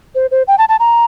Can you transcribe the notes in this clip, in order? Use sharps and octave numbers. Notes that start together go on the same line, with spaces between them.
C5
C5
G5
A5
A5
A#5